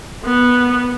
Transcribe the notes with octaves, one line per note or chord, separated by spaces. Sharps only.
B3